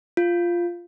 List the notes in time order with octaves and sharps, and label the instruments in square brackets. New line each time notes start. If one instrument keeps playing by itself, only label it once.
[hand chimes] F4